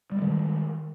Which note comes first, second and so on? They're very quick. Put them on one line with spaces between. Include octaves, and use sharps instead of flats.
G3 G#3 D#3